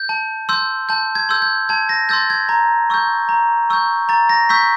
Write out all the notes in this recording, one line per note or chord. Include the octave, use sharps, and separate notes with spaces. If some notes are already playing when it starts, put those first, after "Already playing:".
Already playing: G6
A5
C6 E6 G6
A5 G6
G#6
C6 E6 G6
G6
A5 G#6
A#6
C6 E6 G6 A6
G#6
A#5
C#6 E6 G6
A#5
C#6 E6 G6
A#5 A6
A#6
C#6 E6 G6 B6